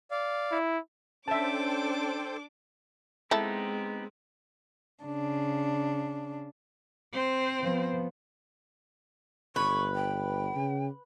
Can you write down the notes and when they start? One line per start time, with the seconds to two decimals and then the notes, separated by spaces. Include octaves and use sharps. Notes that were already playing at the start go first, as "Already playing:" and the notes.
0.11 D5 F5
0.51 E4
1.28 C#4 D4 A4 C5 E5 G5 A5 D6
3.31 G#3 B3 C4 D#4 E4 G4 A4
5.02 C#3 D4
7.14 C4 C5
7.61 F3 B3
9.56 G1 B4 C#6
9.95 G5
10.56 C#3